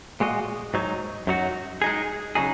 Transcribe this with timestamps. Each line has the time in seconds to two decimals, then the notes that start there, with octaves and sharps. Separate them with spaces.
0.20 A#2 G#3 F#4 D#5
0.74 G#2 F#3 D#4
1.27 F#2 F#3 D#4 F#4
1.82 G#3 D#4 G#4
2.35 C#3 F#3 D#4 G#4